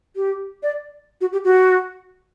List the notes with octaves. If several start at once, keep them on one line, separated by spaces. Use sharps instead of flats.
G4
D5
F#4
G4
F#4